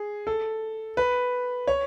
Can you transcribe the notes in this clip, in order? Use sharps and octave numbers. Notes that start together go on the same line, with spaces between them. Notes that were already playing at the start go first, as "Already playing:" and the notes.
Already playing: G#4
A4
B4
C#5